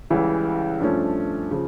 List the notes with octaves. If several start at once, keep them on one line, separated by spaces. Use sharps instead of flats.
C#2 C#3 E3 G3
G2 F3 A3 C#4
C#3 F3